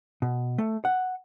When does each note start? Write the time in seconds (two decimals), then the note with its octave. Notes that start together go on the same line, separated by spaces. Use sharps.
0.22 B2
0.58 A3
0.85 F#5